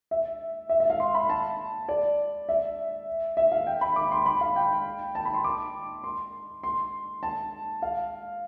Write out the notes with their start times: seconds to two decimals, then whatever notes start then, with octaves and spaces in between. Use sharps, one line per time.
0.11 E5
0.69 E5
0.80 E5
0.90 F5
1.00 C6
1.15 B5
1.29 A5
1.88 D5
2.49 E5
3.37 E5
3.52 F5
3.67 G5
3.81 B5
3.96 D6
4.11 C6
4.26 B5
4.41 F5
4.56 G5
5.15 A5
5.25 B5
5.34 C6
5.44 D6
6.04 C6
6.63 C6
7.23 A5
7.82 F5